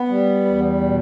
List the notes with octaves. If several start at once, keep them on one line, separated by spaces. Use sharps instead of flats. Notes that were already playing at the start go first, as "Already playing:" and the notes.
Already playing: B3
G3
E2
B2